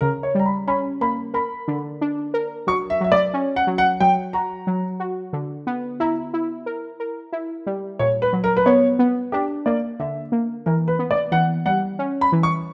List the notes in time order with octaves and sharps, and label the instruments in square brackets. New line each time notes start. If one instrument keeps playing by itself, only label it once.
[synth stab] C#3 [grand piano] A#4
[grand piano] C#5
[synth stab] G3 [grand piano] A#5
[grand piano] B5
[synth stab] C#4 [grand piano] B5
[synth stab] A#3 [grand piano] B5
[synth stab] A#4 [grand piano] B5
[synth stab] D3
D4
A#4
[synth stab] F#3 [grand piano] C#6
[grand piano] E5
[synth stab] F#3 [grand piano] E5
[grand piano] D5
[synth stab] C#4
[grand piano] F#5
[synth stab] F#3
[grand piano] F#5
[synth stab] F#3 [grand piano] G5
[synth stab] F#4 [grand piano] A#5
[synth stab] F#3
F#4
D3
B3
[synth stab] E4 [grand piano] A#5
[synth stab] E4
A#4
A#4
E4
G3
[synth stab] A#2 [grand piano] C#5
[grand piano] B4
[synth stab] F#3
[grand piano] A#4
B4
[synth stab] B3 [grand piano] C#5
[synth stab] B3
[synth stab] D4 [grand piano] G4
[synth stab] A#3 [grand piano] D5
[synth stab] D3 [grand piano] E5
[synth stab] A#3
[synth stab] E3 [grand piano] A#4
[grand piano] B4
[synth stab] B3
[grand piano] D5
[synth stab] E3 [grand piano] F#5
[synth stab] G3 [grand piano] F#5
[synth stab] C#4
[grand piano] B5
[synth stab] E3
[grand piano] C#6